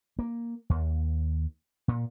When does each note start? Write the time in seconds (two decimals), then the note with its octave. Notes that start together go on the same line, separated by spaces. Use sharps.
0.19 A#3
0.70 D#2
1.88 A#2